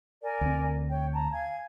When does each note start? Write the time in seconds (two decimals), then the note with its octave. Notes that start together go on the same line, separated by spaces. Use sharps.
0.23 A#4 D5 G#5
0.41 D2 C4
0.89 C#5 G5
1.14 A5 A#5
1.31 F5 G#5 G#6